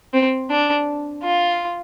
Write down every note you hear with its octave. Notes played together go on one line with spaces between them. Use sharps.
C4
D4
F4